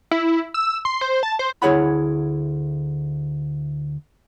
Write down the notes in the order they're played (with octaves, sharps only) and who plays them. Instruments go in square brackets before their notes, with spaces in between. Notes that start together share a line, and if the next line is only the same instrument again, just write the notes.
[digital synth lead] E4
E6
C6
C5
A5
C5
[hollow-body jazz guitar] D2 E4 G#4 C#5 F#5 B5